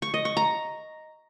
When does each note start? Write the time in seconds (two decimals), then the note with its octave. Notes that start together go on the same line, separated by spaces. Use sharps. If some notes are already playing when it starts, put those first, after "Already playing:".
0.02 C#6
0.14 D#5
0.25 C#6
0.37 A#5